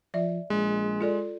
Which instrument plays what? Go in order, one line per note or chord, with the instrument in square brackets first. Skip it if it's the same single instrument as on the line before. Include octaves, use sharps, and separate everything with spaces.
[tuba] F3 [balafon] D5 E5
[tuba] A#1 [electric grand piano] G#3
[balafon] F4 A4 D5